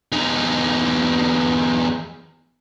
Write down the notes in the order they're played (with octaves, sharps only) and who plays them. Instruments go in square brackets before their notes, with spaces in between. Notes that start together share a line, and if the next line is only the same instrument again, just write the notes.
[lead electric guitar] E2 D#4